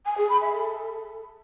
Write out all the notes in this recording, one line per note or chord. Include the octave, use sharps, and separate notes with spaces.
G#5
G#4
B5
E5
A4